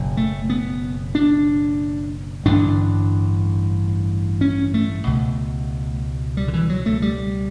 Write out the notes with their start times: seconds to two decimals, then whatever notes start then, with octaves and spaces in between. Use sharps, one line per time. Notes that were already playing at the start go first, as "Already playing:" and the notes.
Already playing: F#1 B2
0.17 A3
0.50 B3
1.15 D4
2.46 A1 G2 D3 D4
4.41 C#4
4.74 A3
5.07 C#2 B2
6.37 G3
6.48 D3
6.53 E3
6.70 F#3
6.86 A3
7.02 G3